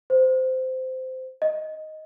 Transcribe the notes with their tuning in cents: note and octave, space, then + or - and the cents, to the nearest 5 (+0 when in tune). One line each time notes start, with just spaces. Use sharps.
C5 -15
D#5 +5